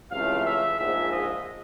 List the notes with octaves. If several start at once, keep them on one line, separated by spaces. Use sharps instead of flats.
C#2 C3 E3 A3 C#4 F5
E5
A#1 G#2 F3 G#3 E5
D#5